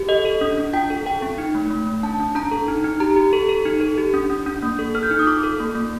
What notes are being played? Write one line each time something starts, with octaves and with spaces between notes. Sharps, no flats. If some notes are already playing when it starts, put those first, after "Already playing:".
Already playing: G4
A4 D#5
A4
D4
D4
F4 G5
A4
A4 G5
C4
D#4
A3
A3
A3
D4 A5
D4
D4 A#5
A4
D#4
D#4
G4 A#5
G4
A4
A4
D#4
A4
G4
D4
D4
D4
A#3
A4
A4 F6
G6
D#4 F6
D#6
F4 D6
A4
A#3
A#3